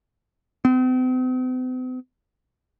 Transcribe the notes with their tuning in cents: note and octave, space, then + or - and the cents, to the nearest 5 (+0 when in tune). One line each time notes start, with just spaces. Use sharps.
C4 -45